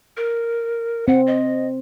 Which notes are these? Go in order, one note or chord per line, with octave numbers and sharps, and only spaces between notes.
A#4
C4 F#5
D#5